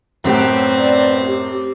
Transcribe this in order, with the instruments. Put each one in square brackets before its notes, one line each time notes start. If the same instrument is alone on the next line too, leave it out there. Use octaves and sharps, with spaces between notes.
[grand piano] F#2 A2 [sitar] F#3 B3 G4 [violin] C4
[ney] D5
G4